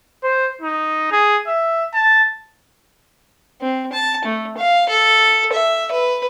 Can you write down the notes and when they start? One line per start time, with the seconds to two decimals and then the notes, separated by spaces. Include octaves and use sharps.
0.23 C5
0.62 D#4
1.12 G#4
1.47 E5
1.94 A5
3.61 C4
3.93 A5
4.25 A3
4.58 F5
4.89 A4
5.53 E5
5.92 B4